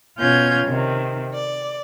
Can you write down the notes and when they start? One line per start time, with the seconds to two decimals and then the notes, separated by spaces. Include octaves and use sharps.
0.17 B2 C#4 F4 F6 G6 G#6
0.66 C3 D#3
1.34 D5